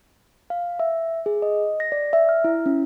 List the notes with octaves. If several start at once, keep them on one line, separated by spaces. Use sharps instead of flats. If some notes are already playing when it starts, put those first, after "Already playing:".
F5
E5
G#4
D#5
A#6
D5
E5
F6
E4
C#4